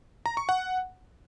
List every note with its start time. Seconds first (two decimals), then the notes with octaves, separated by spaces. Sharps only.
0.26 A#5
0.37 C#6
0.49 F#5